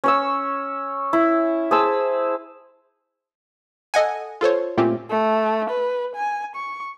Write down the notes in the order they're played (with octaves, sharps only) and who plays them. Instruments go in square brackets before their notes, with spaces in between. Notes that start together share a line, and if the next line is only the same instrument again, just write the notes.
[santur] C#4 C#5 E6
E4
G#4 C5 A5 E6
[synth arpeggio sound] A4 D#5 F#5 G#5
F4 A4 C5 C#5
A#2 A3 C4 C#4 F4 G4
[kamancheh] A3
B4
G#5
C#6